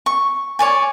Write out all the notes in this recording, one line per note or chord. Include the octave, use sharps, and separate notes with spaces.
C#6
C#5 D5 G#5